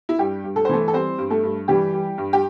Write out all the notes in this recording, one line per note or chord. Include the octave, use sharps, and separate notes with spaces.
E4
G2 G3 G4
G2
A4
C5
E3 A3 A4
A4
G3 C4 C5
G2
A3 A4
G2
E3 G3 G4
G3
G2
G4